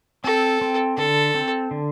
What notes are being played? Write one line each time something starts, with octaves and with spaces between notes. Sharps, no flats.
C4 A4
C4
D3 A4
C4
D3